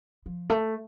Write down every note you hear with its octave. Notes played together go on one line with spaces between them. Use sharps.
F3
A3